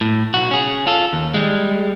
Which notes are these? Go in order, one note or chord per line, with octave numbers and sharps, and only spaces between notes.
A2
B1 F#4
C#4 G#4
F4 A4
D#2
G3 G#3